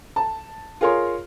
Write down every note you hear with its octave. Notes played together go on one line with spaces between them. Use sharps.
A5
F4 G#4 A#4 C#5 C6